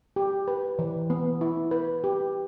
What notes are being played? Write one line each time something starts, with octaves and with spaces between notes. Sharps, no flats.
G4
B4
E3
B3
E4
B4
G4